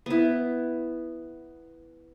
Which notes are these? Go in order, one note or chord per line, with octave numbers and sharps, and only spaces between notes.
B3 E4